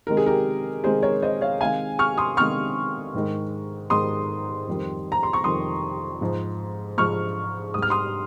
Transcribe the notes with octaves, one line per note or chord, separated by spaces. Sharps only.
C3 D#3 G#3 A#4
G#4
G4 A#4
C3 D#3 G#3 G#4 C5
A#4 C#5
C5 D#5
C#5 F5
C3 D#3 G#3 F5 G#5
C#6 F6
C6 D#6
C3 D#3 G#3 C#6 F6
G#2 D#3 G#3
G#2 D#3 G#3 C6 D#6
F2 D#3 G3
A#5
C6
C#6
F2 D#3 G3 C6 D#6
G#2 F3 G#3
G#2 F3 G#3 C#6 F6
G#2 G3 D#6
F6
C6 D#6